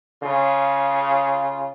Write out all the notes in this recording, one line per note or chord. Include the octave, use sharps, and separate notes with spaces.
C#3 F4